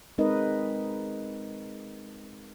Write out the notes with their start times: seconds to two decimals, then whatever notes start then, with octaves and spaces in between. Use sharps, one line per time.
0.18 G#3 C4 D#4 A#4 B4 D#5